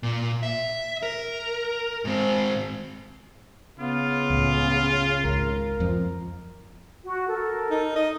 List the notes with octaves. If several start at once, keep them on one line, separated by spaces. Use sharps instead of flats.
A#2
E5
A#4
G#2 C4
C#3 B3 F4
C#2 A2
G#1 C#2 A#4
F2 F3
F#4
A4 A#4
D#4
D#5